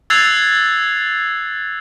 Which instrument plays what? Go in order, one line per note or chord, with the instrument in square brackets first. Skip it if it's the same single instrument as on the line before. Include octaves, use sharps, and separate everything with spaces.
[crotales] E6 F#6 G#6 A6 C7 F7